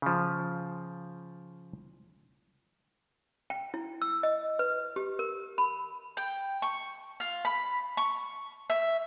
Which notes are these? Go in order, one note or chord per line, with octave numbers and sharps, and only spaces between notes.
C#3 F3
G5
E4
E6
D#5
B4
G4
A#4
B5
G5
C#6
F4
B5
C#6
E5